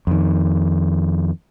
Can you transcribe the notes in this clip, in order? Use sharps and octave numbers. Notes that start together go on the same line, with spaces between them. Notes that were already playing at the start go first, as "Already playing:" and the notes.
F2 D#3